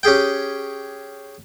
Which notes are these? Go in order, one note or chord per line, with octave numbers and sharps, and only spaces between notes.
C#4 G4 G#4 G5